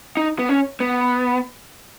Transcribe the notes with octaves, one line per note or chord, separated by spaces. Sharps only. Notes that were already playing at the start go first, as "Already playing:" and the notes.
D#4
B3
C#4
B3